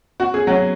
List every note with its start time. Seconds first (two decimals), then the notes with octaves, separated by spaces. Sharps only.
0.20 F#4
0.34 G#4
0.47 F#3 F#4